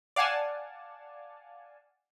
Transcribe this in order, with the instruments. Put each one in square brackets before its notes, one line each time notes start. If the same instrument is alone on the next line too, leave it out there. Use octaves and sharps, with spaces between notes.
[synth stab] D5 F5 F#5 G#5 A5